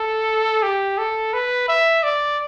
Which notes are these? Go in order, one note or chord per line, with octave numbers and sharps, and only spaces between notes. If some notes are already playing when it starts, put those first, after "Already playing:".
Already playing: A4
G4
A4
B4
E5
D5